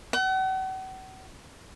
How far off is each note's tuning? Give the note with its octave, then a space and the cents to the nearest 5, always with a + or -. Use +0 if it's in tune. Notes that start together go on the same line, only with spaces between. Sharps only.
F#5 +40